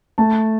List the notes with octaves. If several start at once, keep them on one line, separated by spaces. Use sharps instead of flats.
A3 A5